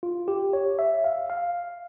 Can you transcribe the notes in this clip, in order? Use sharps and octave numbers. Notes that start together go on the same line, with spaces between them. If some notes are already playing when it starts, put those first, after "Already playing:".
F4
G4
C#5
E5
F5
F5